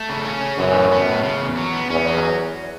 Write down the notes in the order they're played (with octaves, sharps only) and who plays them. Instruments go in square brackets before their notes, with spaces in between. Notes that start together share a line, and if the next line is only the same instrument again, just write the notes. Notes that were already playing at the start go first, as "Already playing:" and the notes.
Already playing: [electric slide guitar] A3
C#3
C#4
C#3
[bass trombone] F#2 [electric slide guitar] E3
[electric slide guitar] A2
B3
A2
C#3
E2
F#3
B3
[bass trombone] E2 [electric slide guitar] C#4
[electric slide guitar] F#3